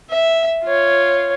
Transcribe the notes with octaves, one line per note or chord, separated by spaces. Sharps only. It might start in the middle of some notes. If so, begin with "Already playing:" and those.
E5
F4 C#5